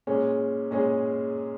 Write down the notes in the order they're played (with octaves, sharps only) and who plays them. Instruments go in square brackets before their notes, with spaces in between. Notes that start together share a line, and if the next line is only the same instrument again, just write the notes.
[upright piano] A#2 G#3 C#4 G#4
A#2 G#3 C#4 G#4